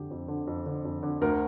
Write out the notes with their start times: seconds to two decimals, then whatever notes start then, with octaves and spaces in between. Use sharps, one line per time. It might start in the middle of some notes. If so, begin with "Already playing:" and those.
Already playing: F2 D3 G4
0.11 F2
0.28 D3
0.47 F2
0.66 D3
0.85 F2
1.03 D3
1.21 D2 A#4